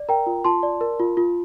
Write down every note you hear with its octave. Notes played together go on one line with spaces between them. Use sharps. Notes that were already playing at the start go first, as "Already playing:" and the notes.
Already playing: D5
A#4 G5 A#5
F4
F4 A5 C6
D5
A#4
F4
F4